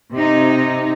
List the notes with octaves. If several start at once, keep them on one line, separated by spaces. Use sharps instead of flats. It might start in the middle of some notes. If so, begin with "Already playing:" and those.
C3 D#4